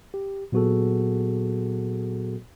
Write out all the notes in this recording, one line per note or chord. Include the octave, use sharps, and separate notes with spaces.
G4
A#2 F#3 B3 F#4 G#4 A4